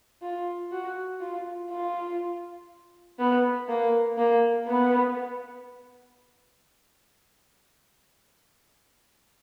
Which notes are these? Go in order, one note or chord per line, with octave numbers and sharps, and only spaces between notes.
F4
F#4
F4
F4
B3
A#3
A#3
B3